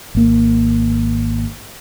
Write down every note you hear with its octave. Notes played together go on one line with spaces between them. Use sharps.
G#1 A#3